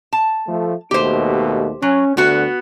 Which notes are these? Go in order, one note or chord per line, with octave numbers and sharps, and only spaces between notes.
A5
F3 A3
D#2 B2 A3 G4 C5
F#3 C#4
D2 B3 F#4